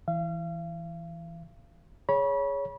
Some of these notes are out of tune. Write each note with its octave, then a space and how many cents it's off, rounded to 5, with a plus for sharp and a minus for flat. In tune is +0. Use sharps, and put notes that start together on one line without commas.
E3 +0 F5 -35
G#4 +0 C#5 +15 B5 -30